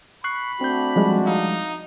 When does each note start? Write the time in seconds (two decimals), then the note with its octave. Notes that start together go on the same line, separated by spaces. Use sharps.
0.24 B5 C#6 F#6 C7
0.61 A3 C4 D4 F#4 G6
0.96 F3 G3 G#3
1.27 D#4 F5